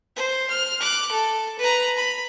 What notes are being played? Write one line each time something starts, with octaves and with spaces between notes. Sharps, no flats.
C5
F6
D6 F#6
A4
B4 A#5
B5